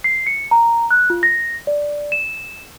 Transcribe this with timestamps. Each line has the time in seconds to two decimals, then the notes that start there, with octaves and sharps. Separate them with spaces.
0.04 C7
0.27 C#7
0.51 A#5
0.91 F#6
1.10 F4
1.23 A#6
1.67 D5
2.12 E7